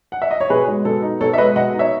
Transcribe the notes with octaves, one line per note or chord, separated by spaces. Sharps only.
F#5
E5
D#5
C#5
B2 G#4 B4
G#3
B2 A4
D#4
B2 A4 C#5
E5
G#3 B4 D#5
B2 D#5 F#5
D#4
C#5 E5